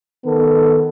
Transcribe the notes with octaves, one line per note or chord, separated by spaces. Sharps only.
D#3 B3 A4